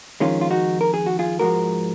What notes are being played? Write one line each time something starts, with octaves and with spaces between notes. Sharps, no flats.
F2 D#3 G#3 C#4 F4
F4
D#4 F#4
A#4
G#4
F#4
F4 G#4
G#2 F3 G#3 F#4 A#4